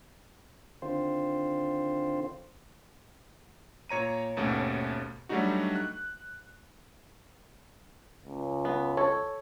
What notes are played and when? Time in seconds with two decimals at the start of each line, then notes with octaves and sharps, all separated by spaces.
0.82 D3 D#3 C4 F4 C5
3.89 A#2 C#5 A#5 D#7
4.36 G#1 D#2 B2 A3 C#4 G4
5.29 F#3 G3 A3 D4 D#4 F#4
5.76 F#6
8.25 C#2
8.65 B3
8.97 A4 C#5